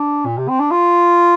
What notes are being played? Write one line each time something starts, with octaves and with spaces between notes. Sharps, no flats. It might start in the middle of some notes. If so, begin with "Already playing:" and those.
Already playing: D4
A#2
C3
C4
D4
F4